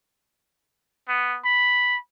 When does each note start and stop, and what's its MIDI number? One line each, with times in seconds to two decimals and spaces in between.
1.08 1.38 59
1.45 1.97 83